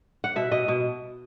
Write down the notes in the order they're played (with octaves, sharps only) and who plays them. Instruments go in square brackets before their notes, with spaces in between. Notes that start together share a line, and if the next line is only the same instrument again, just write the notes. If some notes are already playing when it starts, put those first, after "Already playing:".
[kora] F#5
B2 E5
B2 D#5
B2